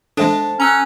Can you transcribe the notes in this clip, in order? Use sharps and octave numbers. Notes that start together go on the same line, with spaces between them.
G#3 D4 A4 C5 E5 A5
C#4 A#5 E6 F#6